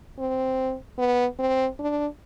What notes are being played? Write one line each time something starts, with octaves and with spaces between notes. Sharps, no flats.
C4
B3
C4
D4